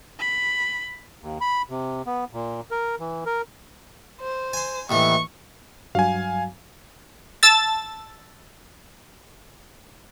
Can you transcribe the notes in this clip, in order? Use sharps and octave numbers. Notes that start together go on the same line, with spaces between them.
B5
D#2
B5
C3
B3
A#2
A#4
E3
A#4
C5
G#5 C6
D#2 A2 E3 C#6
G2 F#3 F#4 F5 G#5
A5 E6 A6